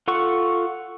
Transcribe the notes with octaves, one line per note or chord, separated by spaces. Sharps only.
F4 A4 F#5 C#6